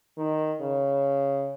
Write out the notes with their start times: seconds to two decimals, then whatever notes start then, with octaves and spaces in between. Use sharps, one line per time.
0.18 D#3
0.61 C#3